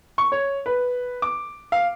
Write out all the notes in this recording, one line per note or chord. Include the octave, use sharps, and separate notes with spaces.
C#6
C#5
B4
D6
F5